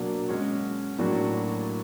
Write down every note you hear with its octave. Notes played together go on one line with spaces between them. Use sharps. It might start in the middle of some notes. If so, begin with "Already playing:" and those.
Already playing: B2 F#3 A#3 D4
G#3 C#4 F#4
A2 F#3 A#3 D4 F#4